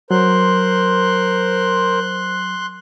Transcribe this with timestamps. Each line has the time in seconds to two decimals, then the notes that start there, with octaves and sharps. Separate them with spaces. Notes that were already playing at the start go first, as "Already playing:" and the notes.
0.11 F#3 A#4 C5 C6 F#6